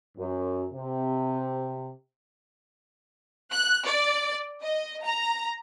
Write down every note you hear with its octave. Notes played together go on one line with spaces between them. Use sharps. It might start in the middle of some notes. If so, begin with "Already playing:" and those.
F#2
C3
F#6
D5
D#5
A#5